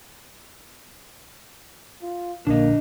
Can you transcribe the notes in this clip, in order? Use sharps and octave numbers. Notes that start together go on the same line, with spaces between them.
F4
A#1 D3 A#3 D4 D#5